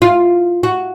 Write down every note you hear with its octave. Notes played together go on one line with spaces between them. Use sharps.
F4
F#4